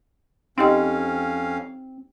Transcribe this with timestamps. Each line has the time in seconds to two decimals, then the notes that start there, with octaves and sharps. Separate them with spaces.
0.58 F2 C4 C#4 D#4 G4 D#5 F5